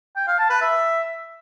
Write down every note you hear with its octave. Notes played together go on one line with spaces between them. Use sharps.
G5
F5
A5
B4
E5